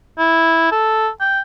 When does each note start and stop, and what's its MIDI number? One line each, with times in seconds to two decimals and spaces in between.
0.18 0.68 64
0.72 1.09 69
1.21 1.40 79